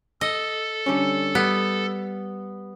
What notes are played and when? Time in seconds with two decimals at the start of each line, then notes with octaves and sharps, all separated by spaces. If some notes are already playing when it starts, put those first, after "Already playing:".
0.21 A4 D#5
0.86 D3 G3 C#4
1.35 G3 B3